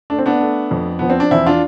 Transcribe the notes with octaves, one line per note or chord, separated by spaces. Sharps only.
A3 D4
C4
B3 D4
A3
F2
F3 B3
C4
D4
E2 C4 E4
D4 F4